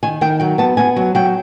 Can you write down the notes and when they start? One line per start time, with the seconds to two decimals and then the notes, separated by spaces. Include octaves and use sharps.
0.03 D#3 G#5
0.21 D#3 G5
0.40 F#3 G5
0.58 B3 A5
0.77 B3 G#5
0.96 F#3
1.15 F#3 G5